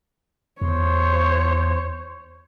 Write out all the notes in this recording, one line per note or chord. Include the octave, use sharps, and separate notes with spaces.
E2 C5 C#5